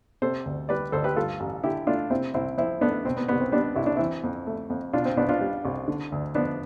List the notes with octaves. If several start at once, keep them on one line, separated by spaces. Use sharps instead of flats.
C3 A4 C5
D2
G3 B4 D5
D2 A4 C5
G4 B4
G2 F4 A4
A1
D3 E4 G4
A3 D4 F4
C3 C4 E4
C2 C4 E4
F3 C4 E4
A3 B3 D4
B2 C4
B3
C2 B3
C4
G3 B3 D4
C2 E4
D4
E3 C4 E4
F2
A3
F2
B2 D4 F4
C4
C2 B3 D4
D4 F4
G3
C2
D3
D2
F3 B3 D4